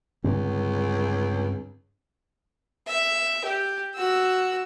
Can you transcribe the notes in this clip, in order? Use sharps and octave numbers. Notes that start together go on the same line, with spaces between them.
C#2 G2 D3 C4
E5
G4
F#4 E6